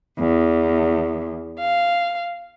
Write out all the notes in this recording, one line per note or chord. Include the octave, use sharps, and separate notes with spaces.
E2
F5